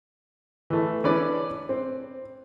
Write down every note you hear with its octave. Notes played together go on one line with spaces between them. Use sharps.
E3 A3
E3 C#4 D4 B4 D5
C4